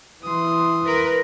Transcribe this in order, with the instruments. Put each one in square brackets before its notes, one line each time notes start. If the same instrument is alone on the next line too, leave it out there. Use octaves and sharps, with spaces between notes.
[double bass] E3 E4 [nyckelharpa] C6 D#6
[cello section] A#4 B4